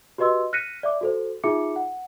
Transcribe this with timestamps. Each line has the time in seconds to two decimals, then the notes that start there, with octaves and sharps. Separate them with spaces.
0.18 F#4 G4 B4 D#5 C6 E6
0.53 F6 F#6 A#6 B6 C#7 D#7
0.83 D5 E5 D6
1.01 F#4 A4 C5
1.44 D#4 F4 G#4 E5 D6 C#7
1.76 F#5